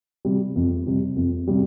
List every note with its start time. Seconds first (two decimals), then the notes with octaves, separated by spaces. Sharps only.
0.25 C3 G3
0.56 F2
0.86 C3 G3
1.16 F2
1.47 C3 G3